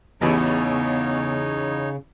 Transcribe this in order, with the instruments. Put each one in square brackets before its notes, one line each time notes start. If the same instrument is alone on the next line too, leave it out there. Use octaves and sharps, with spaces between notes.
[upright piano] A1 E2 E3 [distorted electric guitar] C#3 [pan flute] B3 [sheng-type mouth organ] D#4 C#5